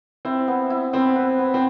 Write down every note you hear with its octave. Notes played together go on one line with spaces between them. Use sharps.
C4 E4
B3
E4
B3 C4
B4
B3
C4